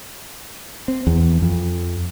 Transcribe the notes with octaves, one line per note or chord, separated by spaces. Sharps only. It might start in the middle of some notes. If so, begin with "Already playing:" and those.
C4
E2
F2